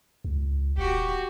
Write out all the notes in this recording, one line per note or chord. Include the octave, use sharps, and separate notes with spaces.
C#2
D#1 F#4 G4